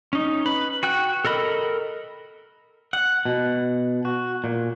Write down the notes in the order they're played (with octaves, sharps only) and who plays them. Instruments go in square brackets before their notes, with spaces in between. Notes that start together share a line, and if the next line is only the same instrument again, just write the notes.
[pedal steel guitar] C#4 D#4
B4 B5
F#4 G5 F#6
A4 A#4 D#5 B5
[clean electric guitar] F#5
B2
F#4
A#2